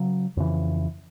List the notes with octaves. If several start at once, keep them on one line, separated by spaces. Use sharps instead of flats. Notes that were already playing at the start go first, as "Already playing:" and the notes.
Already playing: C#3 F#3
F2 C#3 E3